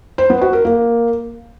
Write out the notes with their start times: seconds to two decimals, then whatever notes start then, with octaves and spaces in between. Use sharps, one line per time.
0.18 C5
0.30 B3
0.41 F#4
0.53 A#4
0.65 A#3